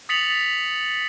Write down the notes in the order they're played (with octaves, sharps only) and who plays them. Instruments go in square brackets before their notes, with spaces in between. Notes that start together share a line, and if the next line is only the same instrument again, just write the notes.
[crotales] D#6 A6 B6 C#7 F7 F#7